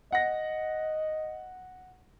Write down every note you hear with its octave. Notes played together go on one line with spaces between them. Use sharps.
D#5 F#5 A#6